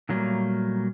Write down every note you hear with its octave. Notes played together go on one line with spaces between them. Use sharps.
A#2 D3 F#3 G3 A3 A#3